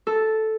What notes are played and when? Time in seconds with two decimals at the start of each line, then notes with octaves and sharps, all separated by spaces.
0.07 A4